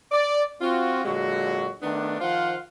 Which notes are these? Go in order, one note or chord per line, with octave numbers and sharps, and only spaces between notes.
D5
C4 F4 F#4
A#2 D3 F#3 G#3 F#4
D#3 A3 B3 D4
D#3 F3 F4 C5 F5 F#5